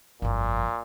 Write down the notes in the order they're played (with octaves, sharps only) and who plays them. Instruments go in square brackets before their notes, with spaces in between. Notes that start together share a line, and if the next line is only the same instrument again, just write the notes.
[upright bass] G1 F2 [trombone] A#2